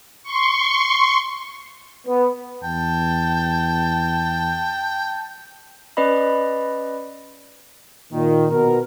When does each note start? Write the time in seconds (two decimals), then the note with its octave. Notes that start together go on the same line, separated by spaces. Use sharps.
0.23 C6 C#6
2.07 B3
2.64 E2 G5 A5
5.97 C#4 B4 D5 D#5 B5
8.12 A#2 D#3
8.51 B2 B3 A#4